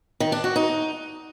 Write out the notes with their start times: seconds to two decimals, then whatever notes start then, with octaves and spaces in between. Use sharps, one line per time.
0.20 D#3
0.32 D4
0.44 F#4
0.56 D#4